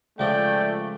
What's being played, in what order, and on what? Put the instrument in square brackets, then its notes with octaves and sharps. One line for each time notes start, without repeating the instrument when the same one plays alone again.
[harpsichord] C#2 F3 [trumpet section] A3 [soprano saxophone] D5 [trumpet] G5